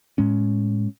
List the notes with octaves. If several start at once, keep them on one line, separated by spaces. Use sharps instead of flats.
A2 G#3 C#4